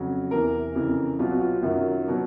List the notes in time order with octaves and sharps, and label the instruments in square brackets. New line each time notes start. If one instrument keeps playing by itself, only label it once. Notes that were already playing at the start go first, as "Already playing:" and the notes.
Already playing: [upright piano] F2 C#3 F#3
E2 C3 E3 A#4
F2 C#3 E3
C2 B2 F#3 F4
F#4
F4
F#2 D#3 F#3
B2 F#3